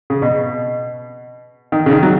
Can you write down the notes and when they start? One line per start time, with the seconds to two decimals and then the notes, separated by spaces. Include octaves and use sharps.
0.10 C#3
0.22 B2
1.72 D#3
1.86 C#3
1.91 D#3
2.03 F#3